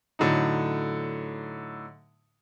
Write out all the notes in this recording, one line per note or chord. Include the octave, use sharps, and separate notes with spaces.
A2 D3 F#3 D#4